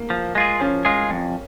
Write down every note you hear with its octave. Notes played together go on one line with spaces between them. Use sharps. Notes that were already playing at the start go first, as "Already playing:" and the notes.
Already playing: A#3
F3
G#3 F4 G#4
F3 C#4
G#3 F4 G#4
F2